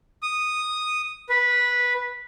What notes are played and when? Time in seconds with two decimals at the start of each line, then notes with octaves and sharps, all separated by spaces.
0.23 D#6
1.29 B4